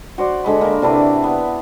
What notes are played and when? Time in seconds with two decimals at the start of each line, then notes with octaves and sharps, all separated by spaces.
0.18 F#4 C5 D5
0.44 D3 G#3 B5
0.61 A#3 A#4
0.82 C3 D4 E4 B4
1.24 B3